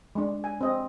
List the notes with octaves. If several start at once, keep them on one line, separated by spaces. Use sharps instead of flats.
G#3 D4
G#5
C4 D#5